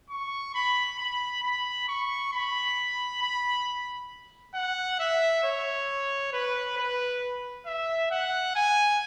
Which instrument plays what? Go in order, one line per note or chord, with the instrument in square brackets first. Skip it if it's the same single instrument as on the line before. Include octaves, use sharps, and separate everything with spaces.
[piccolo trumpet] C#6
B5
B5
B5
C#6
B5
B5
F#5
E5
C#5
B4
B4
E5
F#5
G#5